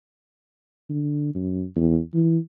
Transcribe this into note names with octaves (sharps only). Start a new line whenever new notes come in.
D3
F#2
E2
E3